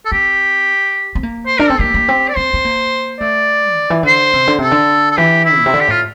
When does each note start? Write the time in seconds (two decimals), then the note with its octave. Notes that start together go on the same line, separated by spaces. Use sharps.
0.05 A4
0.12 C4 G4
1.15 C4
1.23 A#3
1.47 C5
1.58 D4 A#4
1.68 C4 A4
1.80 A#3 G4
1.94 A#3
2.09 C4
2.29 D5
2.36 C4 C5
2.54 C4
2.65 A#3
3.20 A3 D5
3.76 D3
3.90 E3
4.03 D3 C5
4.33 C3
4.47 D3
4.58 C3 A4
4.71 D3
5.11 A4
5.17 E3 G4
5.45 E4
5.58 A#2
5.66 C3
5.74 D3
5.81 G4
5.88 A2 F4